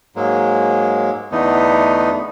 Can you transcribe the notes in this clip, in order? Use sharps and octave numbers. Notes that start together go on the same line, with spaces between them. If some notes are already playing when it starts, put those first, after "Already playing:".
G#2 F#3 G#3 A#3
E2 D3 A3 B3 D#4